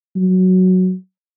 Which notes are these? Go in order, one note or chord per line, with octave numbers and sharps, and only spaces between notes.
F#3